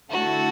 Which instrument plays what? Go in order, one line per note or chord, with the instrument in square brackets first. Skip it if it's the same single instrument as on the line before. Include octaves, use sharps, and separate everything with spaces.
[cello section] D3 A3 E4 A4 [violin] F#4